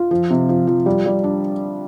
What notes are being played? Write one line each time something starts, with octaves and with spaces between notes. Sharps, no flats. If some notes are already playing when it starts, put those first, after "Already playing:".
Already playing: F4
F3
C3
F3
F3
G3
G3
D4